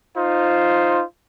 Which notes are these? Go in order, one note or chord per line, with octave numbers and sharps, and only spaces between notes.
D#4 F4 C5